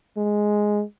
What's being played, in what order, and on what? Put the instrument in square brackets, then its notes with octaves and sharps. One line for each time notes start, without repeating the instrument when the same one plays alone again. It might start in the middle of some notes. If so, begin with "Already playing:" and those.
[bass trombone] G#3